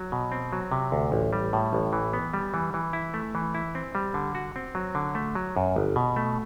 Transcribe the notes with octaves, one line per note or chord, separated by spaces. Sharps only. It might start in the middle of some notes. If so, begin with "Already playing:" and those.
Already playing: F#3
B2
C4
F#3
C3
D2
A1
G3
A2
A1
E3
B3
G3
E3
E3
E4
A3
E3
E4
C4
G3
D3
F#4
C4
F#3
D3
A3
F#3
F#2
G1
B2
A3